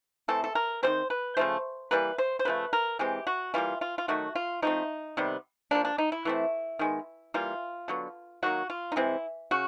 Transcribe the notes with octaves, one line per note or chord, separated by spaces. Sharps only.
E3 A3 C4 A4
A4
A#4
D#3 G3 C4 C5
B4
C#3 F3 A3 C5
E3 G3 A#3 B4
C5
C5
C#3 F3 A3 B4
A#4
E3 G#3 C4 G4
F#4
E3 G3 A#3 F4
F4
F4
D#3 F#3 A3 F#4
F4
F3 A3 C4 D#4
C3 D#3 G3 B3
F3 A#3 D4
D4
D#4
E4
E3 A3 C4
D#3 G#3 B3
E3 G3 A#3 F4
D3 F#3 B3
D#3 F#3 A#3 F#4
F4
D#4
C3 E3 G#3 C4 E4
C#3 F#4